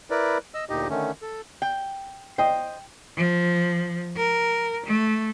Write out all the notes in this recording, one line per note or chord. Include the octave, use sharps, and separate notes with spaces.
E4 A#4 B4 D5
D#5 E6
D2 A#2 D#4 G4 D#5
D3 D#3 A3 C#4
A4
G5
C5 D#5 G5
F3
A#4
A3